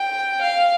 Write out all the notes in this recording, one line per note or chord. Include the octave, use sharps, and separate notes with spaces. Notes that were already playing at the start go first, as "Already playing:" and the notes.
Already playing: G5
F5